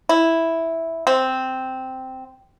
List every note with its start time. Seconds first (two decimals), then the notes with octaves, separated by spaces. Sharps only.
0.09 E4
1.07 C4